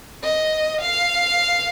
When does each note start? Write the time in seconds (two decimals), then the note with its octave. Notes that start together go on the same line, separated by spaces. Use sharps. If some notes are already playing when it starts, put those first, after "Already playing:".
0.23 D#5
0.81 F5